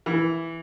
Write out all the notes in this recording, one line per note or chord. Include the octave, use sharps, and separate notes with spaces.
E3